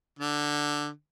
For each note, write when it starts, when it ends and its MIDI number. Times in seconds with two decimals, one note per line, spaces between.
0.19 0.89 50